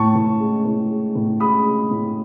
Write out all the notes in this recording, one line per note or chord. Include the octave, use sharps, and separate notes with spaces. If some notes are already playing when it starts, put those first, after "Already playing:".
Already playing: A2 A5 C#6
A2
G#3
A2
G#3
A2
G#3 B5 D#6
G#3
A2